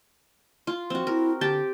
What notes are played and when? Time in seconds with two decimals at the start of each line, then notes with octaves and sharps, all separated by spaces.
0.67 F4
0.90 F3 C4 F#4
1.07 E4 A#4
1.41 D3 G4 G5 A5